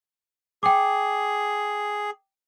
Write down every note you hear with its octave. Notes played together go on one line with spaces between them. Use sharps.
G#4 G5 D6